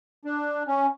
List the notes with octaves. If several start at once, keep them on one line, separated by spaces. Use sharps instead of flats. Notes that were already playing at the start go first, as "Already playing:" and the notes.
D4
C#4